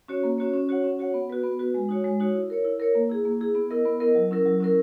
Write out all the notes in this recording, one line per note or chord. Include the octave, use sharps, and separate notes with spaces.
C#4 F#4 C#5
A#3
C#4 F#4 C#5
C#4
F#4 C#5 F#5
C#4
F#4 C#5 F#5
B3
F#4 B4
B3
F#4 B4
G#3
D#4 F#4 C#5
G#3
D#4 F#4 C#5
E4
A#4 C#5
E4
A#4 C#5
A#3
E4 G#4
A#3
E4 G#4
B3
E4 A#4 D#5
B3
E4 A#4 D#5
F#3
C#4 E4 A#4
F#3
C#4 E4 A#4